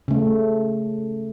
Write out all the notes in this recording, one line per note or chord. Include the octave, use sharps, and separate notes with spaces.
C#3 A3